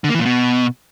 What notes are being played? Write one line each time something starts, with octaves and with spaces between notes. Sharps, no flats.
D3
A#3
E3
A#2
B2